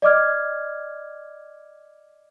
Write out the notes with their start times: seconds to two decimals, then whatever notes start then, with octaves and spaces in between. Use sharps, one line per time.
0.02 D5 D#5 D6 F6 G#6